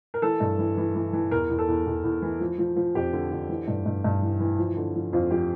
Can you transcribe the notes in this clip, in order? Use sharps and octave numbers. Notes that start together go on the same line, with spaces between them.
A#4
E3 A4
G2
E3
E3
E3
E3
E2 A#4
E2
A4
E2
E2
E2
E3
F3
F3
F3
F2 G4
D3
D3
E3
G2
G2
G2
E3
E3
F3
D3
F3
F2 F4
F3 G4